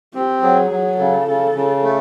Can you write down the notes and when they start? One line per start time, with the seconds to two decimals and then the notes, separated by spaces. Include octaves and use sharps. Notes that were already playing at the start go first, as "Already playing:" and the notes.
0.14 C4 G4
0.42 F#3 G#4
0.71 F#3
0.98 C#3 A4
1.27 C#3
1.55 C#3
1.83 A3